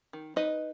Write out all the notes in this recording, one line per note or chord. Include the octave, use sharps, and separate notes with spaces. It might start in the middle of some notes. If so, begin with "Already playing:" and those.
D#3
D#4 B4 D#5